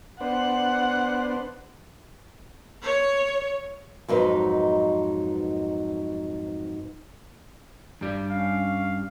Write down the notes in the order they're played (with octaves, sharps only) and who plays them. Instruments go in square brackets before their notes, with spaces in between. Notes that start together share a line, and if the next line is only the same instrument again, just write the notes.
[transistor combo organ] B3 D4 C5 [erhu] F#5
[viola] C#5
[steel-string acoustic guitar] F2 G#2 F#3 D#4 B4
[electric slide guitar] G2 G3
[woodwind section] C#4 F5